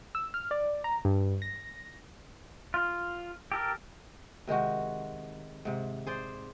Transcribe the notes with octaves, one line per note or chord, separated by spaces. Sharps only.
E6
F6
D5
A#5
G2
A#6
F4
G4 A4 A#4
C3 D#3 G#3 F#4
G#2 C3
G#4 C5 D5